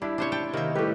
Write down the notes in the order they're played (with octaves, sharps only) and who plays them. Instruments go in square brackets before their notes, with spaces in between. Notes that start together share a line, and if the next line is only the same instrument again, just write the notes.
[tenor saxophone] G3 [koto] D4 [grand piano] E4
[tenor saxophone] C3 [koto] D4 C5 C#5
[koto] G5 A5
[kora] C3 [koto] D#3 E5 [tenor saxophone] A#3
[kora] A2 B4 [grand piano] G3 A3 [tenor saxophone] G4